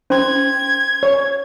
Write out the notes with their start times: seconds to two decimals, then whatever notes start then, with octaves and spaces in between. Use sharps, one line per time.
0.10 C#4 C5 C6 G#6
1.03 C#5